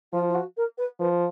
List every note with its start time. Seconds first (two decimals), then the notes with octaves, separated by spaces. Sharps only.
0.12 F3 F4
0.28 F4
0.34 F#4
0.57 A#4
0.78 B4
0.99 F3 B4